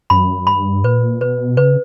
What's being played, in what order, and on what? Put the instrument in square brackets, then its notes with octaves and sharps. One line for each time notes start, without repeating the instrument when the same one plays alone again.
[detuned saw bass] F#2 [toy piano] B5
[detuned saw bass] G2 [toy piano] B5
[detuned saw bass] A#2 [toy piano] B4
[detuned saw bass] B2 [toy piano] B4
[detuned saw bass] C#3 [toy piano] B4